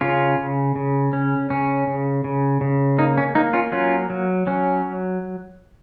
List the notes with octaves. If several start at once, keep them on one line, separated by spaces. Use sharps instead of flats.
C#3 C#4 F4
C#3
C#3
C#4
C#3 C#4
C#3
C#3
C#3
A#3 D#4
C#4
A#3 D#4
C#4 F4
F#3 C#4 F4
F#3
F#3 C#4